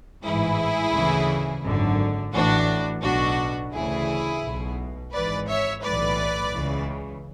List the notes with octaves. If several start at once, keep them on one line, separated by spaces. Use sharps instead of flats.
A1 G#2 E3 E4 G#4
D2 C#3 E3
G#1 F#2 D3
A1 A2 E3 D4 F#4
B1 B2 D4 F#4
D2 C#3 E3 E4 G#4
B1 B2
G#1 G#2 E3 B4 D5
C#5 E5
B1 A2 E3 B4 D5
C#2 C#3 E3